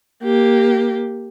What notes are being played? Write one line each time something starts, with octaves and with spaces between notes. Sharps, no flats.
A#3 G4